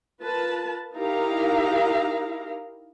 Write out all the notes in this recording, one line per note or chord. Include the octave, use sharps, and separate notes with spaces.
F4 A#4 B4 A5
D#4 E4 G4 A#4 F5 A#5